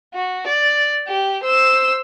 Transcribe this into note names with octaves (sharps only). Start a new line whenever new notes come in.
F#4
D5
G4
C5 E6